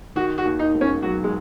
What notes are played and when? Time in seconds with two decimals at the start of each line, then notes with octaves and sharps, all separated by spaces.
0.16 D#3 F#4
0.38 F#4
0.45 D#2
0.59 D#4
0.74 E1
0.81 C#4
1.03 F#3 F#4
1.24 G#3